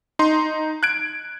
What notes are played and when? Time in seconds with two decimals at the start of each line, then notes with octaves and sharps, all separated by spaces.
0.19 D#4 C6
0.83 F#6 G#6 D7